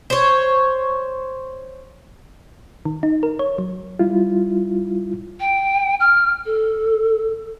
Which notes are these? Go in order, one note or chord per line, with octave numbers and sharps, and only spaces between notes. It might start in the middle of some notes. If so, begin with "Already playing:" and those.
C5 C#5
D#3
D#4
A#4
C#5
F#3
G3 E4 F4
G5
F6
A4